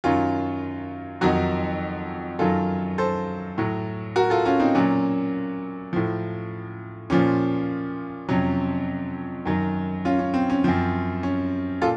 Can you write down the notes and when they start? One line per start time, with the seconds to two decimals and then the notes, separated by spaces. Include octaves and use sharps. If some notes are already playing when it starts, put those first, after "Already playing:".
0.04 F#2 D#3 F#3 C#4 F4
1.21 F2 D#3 F#3 D#4 F#4
2.39 F#2 D#3 F#3 F4 A4
2.98 A4 C5
3.58 A2 F#3
4.16 F#4 A#4
4.30 F4 A4
4.45 C#4 F4
4.60 C4 D#4
4.75 A#2 F#3 C#4
5.93 A2 F3
7.10 A#2 F3 C#4
8.29 F2 C3 F#3 C#4
9.45 F#2 D#3 F#3
10.05 C#4 F4
10.19 C#4
10.34 C4
10.50 C#4
10.64 F#2 F3 C4
11.23 C#4
11.81 A#2 F4 A4